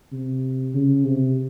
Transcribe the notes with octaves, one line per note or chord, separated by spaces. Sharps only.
C3
C#3
C3